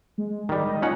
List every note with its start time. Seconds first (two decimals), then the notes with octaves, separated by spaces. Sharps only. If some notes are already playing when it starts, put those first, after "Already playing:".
0.18 G#3
0.49 D#3 G3
0.65 D#5
0.82 C#4 D#4 F4 F#5